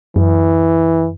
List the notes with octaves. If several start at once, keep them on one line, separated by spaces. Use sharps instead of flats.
F#2 E3